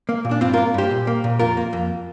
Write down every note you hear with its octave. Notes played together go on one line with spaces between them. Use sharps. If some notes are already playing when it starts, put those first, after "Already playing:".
A#3
A#2
D4
G2 C4 F4
F4 A#4
A#3
G2 G4 C5
A#2
A#3
A#2
F2 F4 A#4
A#3
F2